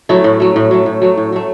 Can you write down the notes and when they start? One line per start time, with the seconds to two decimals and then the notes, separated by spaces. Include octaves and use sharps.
0.09 F#3 A3 E4
0.24 A2
0.40 F#3 A3
0.56 A2
0.71 F#3 A3
0.86 A2
1.02 F#3 A3
1.18 A2
1.32 F#3 A3